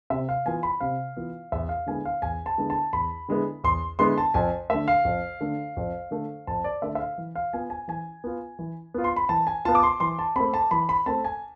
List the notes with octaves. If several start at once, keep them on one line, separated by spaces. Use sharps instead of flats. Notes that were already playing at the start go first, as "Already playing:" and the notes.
C3 E5
F5
E3 B3 F4 G#5
B5
C3 F5
E3 B3 F4
E2 E5
F5
D3 G#3 B3 E4 G#5
F5
E2 G#5
A5
D3 G#3 B3 E4
A5
E2 B5
D3 G#3 B3 E4
E2 C6
D3 G#3 B3 E4 C6
A5
F2 G#5
D3 A3 E5
F5
F2
D3 A3
F2
D3 A3
F2 A5
D5
D3 A3 E5
E5
F5
E3
F5
B3 F4 G#5
G#5
E3 G#5
B3 F4
E3
B3 F4
C6
B5
E3 A5
G#5
B3 F4 A5
D6
C6
E3 C6
A5
A3 C4 B5
A5
E3 B5
B5
A3 C4 A5
G#5